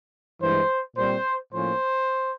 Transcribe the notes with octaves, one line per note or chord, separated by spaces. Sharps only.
G2 E3 G#3 C5
A#2 G3 C4 C5
A2 F3 A#3 C#4 C5